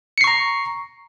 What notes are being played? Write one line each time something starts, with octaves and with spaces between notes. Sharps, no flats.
A#5 C#6 C7 C#7